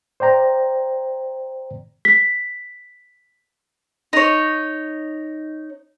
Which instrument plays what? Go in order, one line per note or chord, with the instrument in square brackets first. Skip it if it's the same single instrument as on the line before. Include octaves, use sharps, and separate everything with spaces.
[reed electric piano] C5 D5 G5 A#5
[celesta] B6
[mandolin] D#4 C#5